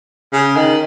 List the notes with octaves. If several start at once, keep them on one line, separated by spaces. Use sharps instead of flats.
C#3
D#3